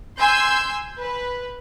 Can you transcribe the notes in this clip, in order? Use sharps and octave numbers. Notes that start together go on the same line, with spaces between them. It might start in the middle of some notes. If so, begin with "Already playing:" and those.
G#5 C6 E6 G6
B4